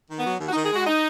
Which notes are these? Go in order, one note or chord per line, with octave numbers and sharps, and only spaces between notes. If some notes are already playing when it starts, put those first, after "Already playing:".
D#3
B3
F#3
D#2
F#4
D#4
D#3
G#4
G#3 F#4
D#4